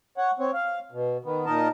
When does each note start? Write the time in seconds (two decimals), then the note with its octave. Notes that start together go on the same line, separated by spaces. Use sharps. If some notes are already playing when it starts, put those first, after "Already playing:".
0.17 C#5 F#5
0.39 C4 C#5
0.54 F5
0.92 B2
1.25 D#3 B3
1.46 A#2 D#4 A#4 D#5 A5